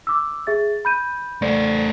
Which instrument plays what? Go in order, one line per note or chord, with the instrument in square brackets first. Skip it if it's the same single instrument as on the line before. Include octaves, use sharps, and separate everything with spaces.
[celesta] D6 E6
G#4 E5 A6
B5 G6 D#7
[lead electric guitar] A3 C5 [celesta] D5